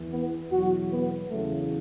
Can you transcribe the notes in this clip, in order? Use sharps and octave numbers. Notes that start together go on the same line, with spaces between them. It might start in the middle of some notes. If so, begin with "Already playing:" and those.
Already playing: E2 E3
B3
E2 B2 F#3 F#4
B3
E2 C#3 F#3 A3